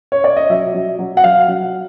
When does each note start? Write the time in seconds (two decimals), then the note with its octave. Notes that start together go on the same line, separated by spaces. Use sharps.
0.12 C#5
0.24 D5
0.37 D#5
0.50 F#3 E5
0.74 F#3
0.99 F#3
1.17 F#5
1.24 F#3 F5
1.48 F#3